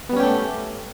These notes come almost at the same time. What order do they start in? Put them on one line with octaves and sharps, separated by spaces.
B3 G3 C#4 G4 A3